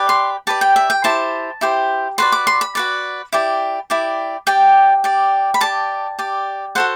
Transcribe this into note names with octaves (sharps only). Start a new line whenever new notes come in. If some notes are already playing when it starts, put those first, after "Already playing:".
Already playing: G4 B4 D5
C6
G4 B4 D5 A5
G5
E5
G5
E4 G4 C5 A5
E4 G4 C5
F#4 B4 D5 C6
D6
C6
B5
F#4 B4 D5
E4 G4 D5
E4 G4 D5
G4 D5 G5
G4 D5
B5
G4 D5 A5
G4 D5
F#4 A4 C5 F#5